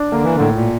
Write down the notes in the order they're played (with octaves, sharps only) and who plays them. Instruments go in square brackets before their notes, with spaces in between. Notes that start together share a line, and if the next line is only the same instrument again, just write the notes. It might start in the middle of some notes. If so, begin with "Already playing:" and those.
Already playing: [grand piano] D4
[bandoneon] D3 [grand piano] A#3
[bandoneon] E3
[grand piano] A2 [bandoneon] D3
[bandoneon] A#2